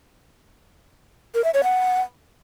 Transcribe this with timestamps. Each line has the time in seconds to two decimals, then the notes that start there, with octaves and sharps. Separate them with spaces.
1.35 A#4
1.44 E5
1.54 C#5
1.64 F#5